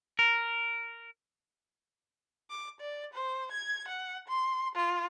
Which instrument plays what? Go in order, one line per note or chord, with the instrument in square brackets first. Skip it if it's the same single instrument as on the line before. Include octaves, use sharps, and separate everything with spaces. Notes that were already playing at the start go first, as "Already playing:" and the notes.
[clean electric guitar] A#4
[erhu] D6
D5
C5
G#6
F#5
C6
F4